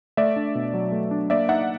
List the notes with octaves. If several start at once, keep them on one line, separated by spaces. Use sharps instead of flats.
A3 D5 E5
D4
B2
F#3
A3
D4
A#3 D5 E5
D#4 E5 F#5